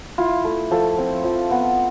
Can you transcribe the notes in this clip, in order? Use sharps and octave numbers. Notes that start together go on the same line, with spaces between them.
E4 F4
A3
F3 A4
C4
F3
B3